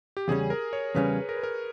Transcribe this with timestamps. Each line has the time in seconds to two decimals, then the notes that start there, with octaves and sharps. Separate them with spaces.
0.17 G4
0.28 E2 C#3 G3 C#4 G#4
0.50 A#4
0.73 C#5
0.95 E2 C#3 G3 C#4 B4
1.29 A#4
1.36 B4
1.43 A#4